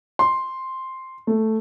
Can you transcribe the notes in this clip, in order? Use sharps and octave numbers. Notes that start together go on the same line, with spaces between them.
C6
A3